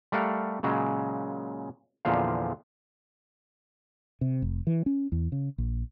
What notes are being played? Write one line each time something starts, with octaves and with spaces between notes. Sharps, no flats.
G3 A3 A#4 F5 F#5
A#2 C#3 F#3 G#3
E2 A#2 D3 F3 F5
C3
F1
E3
C#4
E2
C#3
A#1